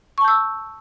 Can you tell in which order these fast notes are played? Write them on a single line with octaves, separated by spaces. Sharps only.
C#6 A5 G6 E6